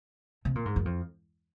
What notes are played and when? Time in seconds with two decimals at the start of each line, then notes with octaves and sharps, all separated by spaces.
0.45 C3
0.55 A#2
0.65 G#2
0.76 F#2
0.85 F2